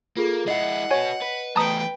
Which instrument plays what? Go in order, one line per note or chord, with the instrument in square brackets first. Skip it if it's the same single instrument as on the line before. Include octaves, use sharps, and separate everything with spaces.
[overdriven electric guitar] A#3 [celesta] F4 G#4 A4
[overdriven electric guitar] G#3 E4 [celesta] D#5 C7 [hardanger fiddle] F#5
[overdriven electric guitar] F#4 B4 [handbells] C#5 G#5
[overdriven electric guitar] B4
[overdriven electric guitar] E2 A3 [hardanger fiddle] B4 G5 [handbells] A5 A#5 D#6